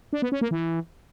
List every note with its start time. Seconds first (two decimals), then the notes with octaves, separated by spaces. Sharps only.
0.13 D4
0.22 B3
0.32 C#4
0.41 A#3
0.51 E3